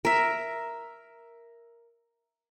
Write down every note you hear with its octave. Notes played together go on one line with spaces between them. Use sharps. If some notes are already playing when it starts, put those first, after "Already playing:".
A#4 E5